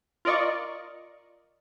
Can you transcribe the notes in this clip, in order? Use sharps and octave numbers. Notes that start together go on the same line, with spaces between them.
F4 A#4 D5 D#5 C#6